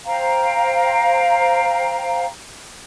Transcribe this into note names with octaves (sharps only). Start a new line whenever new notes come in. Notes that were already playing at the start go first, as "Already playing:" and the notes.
C5 F5 G5 A#5